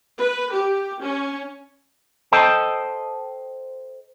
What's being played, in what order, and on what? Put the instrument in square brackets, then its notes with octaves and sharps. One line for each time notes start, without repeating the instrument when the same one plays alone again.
[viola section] B4
G4
C#4
[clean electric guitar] A4 C5 D#5 G5 A5